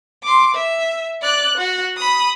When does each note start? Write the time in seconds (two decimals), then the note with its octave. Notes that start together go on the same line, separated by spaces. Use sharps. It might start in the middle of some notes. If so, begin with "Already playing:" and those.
0.23 C6 D6
0.55 E5
1.22 D5 F#6
1.58 F#4
1.97 B5 D#6